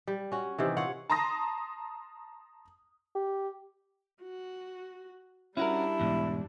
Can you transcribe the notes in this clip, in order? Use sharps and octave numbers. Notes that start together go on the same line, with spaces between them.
G3
C#4 F#4
C3 D#3 E3
F4 C#5 F#5
A5 A#5 C6 D#6 A#6
G4
F#4
G3 C#4 D4 E4 F#4 A#4
E2 G#2 B2